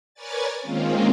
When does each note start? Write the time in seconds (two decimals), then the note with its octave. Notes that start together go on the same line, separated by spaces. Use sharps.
0.14 A#4 B4 C#5 D5 G#5 A6
0.62 D#3 G#3 A#3 C4 C#4 F4